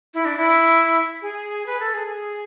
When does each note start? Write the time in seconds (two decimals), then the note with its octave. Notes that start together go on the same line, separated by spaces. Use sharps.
0.14 E4
0.25 D4
0.37 E4
1.22 G#4
1.66 B4
1.80 A4
1.94 G#4